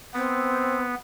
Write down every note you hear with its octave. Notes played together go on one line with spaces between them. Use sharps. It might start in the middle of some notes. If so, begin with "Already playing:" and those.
B3 C4